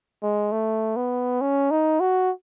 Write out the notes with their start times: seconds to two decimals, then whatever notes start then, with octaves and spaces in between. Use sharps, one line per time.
0.23 G#3
0.52 A3
0.96 B3
1.41 C#4
1.71 D#4
2.00 F#4